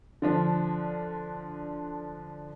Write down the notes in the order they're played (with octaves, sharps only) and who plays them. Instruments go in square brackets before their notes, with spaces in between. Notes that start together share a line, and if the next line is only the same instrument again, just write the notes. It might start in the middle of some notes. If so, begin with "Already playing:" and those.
[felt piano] D3 F3 D4